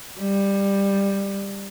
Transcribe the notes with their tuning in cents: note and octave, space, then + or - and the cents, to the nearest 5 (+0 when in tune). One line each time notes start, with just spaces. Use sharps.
G3 +15